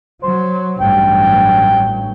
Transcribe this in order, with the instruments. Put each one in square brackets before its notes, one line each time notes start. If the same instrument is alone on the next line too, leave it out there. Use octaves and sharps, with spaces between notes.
[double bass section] F#3 [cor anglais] C5
[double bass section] A1 G2 F#3 [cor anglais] G5